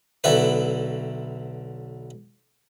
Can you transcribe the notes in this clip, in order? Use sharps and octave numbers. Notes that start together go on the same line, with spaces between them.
B1 D3 E4 B4